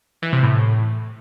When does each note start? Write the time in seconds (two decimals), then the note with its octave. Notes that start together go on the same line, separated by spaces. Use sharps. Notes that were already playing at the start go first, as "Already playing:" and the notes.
0.22 E3
0.33 C3
0.43 A2